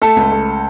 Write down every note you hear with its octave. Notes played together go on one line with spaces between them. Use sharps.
A3 A4
C#2
A3